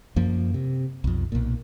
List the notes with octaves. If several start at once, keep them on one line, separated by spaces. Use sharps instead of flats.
F#2 F3 A#3
C3
B1 F2
B1 A#2